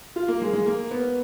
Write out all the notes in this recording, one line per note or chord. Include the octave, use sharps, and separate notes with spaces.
F4
A#3
G#3
G#3
A#3
B3